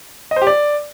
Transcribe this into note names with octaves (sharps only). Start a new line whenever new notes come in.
D#5
C5
G4
D5